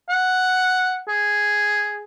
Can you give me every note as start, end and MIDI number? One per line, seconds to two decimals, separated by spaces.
0.09 0.98 78
1.09 2.04 68